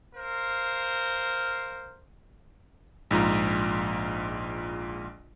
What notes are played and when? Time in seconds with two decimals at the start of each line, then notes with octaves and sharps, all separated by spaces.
0.14 A#4 C5 F5
3.11 A#1 G#2 F4 A#5